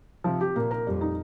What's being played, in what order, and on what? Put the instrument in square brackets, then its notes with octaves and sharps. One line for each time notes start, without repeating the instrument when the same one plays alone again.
[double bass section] C3 [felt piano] F3
[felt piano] G4
[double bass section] A#2 [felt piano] A#3
[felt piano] A#4
[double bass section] F2 [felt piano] G3
[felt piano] D#4